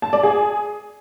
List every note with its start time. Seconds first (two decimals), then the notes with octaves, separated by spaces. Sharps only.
0.02 A5
0.13 D5
0.23 G#4